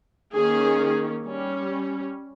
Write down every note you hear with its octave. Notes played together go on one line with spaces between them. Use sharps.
D#3 A#3 C#4 G#4
G3 C#4